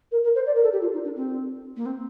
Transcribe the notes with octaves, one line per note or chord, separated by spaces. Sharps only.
A#4
A#4
C5
D5
A#4
A4
G4
F4
D#4
D4
C4
A#3
C4